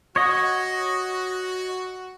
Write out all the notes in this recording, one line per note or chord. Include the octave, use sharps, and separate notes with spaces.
F#4 C#5 D#5